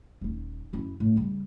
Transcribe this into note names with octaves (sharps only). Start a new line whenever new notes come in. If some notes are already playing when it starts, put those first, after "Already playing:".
D#1 D#4
F#2 E4
A2
C#3 G3